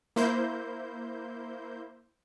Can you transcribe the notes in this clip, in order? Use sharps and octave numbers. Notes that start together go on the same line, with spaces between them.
A#3 E4 C5 G6